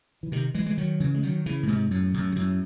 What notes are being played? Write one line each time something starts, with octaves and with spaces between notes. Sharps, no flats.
E3
C3 D#3
E3 G#3
E3 G#3
D#3 F#3
C#3 E3
G#3
D#3 F#3
C#3 E3
A2
G#2 C3
F#2 A2
F#2 A2
C3
F#2 A2